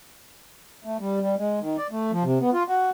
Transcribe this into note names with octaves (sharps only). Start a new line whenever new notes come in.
A3
G3
G3
G#3
D#3
D5
A3
F3
C3
B3
F4
F#4